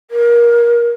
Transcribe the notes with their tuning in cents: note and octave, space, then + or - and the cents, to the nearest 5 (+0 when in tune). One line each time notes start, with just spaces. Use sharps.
A#4 +25